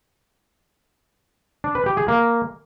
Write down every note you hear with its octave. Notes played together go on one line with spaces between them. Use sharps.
D4
B4
G4
G#4
A#3